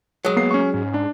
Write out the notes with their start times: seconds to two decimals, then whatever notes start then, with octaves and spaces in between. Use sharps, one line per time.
0.25 F#3 G#3
0.36 A#3 B3 C7
0.51 C#4 C#6
0.74 G#2 C#4
0.94 D4